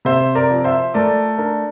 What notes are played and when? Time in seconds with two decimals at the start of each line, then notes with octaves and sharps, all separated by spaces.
0.05 C3 C5 E5
0.35 A#4 D5
0.50 F3
0.64 C5 E5
0.94 A3 A#4 D5
1.38 D4 A#4